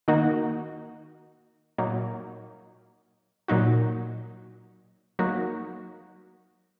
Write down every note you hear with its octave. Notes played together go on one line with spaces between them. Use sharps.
D#3 A#3 D#4 F#4
A#2 F#3 A#3 D#4
A#2 F#3 D#4 F#4
F#3 A#3 D#4 F#4